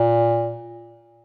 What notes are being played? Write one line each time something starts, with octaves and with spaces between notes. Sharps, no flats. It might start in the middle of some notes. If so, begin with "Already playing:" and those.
Already playing: A#2